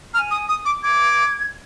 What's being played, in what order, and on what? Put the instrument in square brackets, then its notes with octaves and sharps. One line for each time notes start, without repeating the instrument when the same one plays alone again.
[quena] A#5 [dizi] F6
[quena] G#5
[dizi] D#6
D#6
D6
[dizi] D6 [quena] G#6